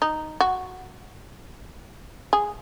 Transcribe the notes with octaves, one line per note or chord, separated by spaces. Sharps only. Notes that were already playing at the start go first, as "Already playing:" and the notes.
D#4
F#4
G#4